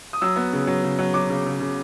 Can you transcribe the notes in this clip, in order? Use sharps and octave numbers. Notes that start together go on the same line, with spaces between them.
D#6
F#3 E6
B3
C#3
F#3
C#3
F#3
F#3 D6
C#3
C#3
C#3